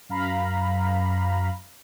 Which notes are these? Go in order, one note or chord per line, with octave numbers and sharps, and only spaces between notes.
F#2 F5 A#5 B5